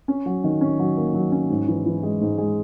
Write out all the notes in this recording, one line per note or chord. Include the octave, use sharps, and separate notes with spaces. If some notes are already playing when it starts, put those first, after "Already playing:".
C#4
F#3
D#3
C#4
F#3
A#3
F#3
C#4
G#2
E3
E3
G#3
G#2
G#3